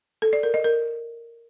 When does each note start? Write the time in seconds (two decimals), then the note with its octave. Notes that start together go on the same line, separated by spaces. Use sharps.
0.22 A4
0.33 D5
0.43 A#4
0.54 D#5
0.64 A#4